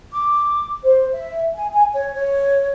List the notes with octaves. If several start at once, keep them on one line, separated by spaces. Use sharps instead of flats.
D6
C5
E5
G#5
G#5
C#5
C#5